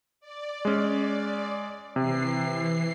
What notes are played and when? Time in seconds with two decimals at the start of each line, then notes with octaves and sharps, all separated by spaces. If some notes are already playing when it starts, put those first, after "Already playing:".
0.20 D5
0.65 G#3 C#4
1.96 C3 E3 C7